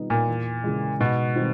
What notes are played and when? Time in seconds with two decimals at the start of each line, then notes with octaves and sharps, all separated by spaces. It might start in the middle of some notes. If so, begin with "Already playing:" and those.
Already playing: B2 G3 B3 D#4
0.10 A#2
0.28 E2
0.64 C#3 E3 G#3
1.00 G#2 B2
1.36 D#3 G3 C4